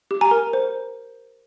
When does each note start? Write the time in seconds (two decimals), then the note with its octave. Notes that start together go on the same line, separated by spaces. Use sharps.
0.11 G4
0.21 G#5 A#5
0.31 A#4
0.53 C5